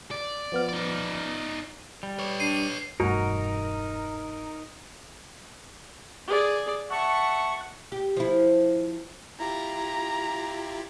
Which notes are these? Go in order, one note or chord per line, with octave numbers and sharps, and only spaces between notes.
D5
F3 B3 F6
D#4 D5
G3
B4 C#5
D4 C7 D#7
E1 G2 A3 D#4 F#4 A#4
G#4 D5
E5 F#5 A5 C#6
G4
F3 E4
E4 F4 G4 A#5